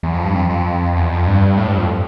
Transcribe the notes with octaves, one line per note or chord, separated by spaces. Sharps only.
E2
F2
G2
F2
F2
E2
F2
G2
A2
G2
F2